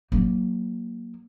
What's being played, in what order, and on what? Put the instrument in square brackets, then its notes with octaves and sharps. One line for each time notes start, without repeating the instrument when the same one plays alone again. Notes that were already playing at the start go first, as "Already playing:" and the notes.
[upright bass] F#3 A#3